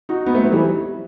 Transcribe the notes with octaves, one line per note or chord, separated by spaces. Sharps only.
D#4 F#4
B3 D#4
A3 C4
F#3
E3 G3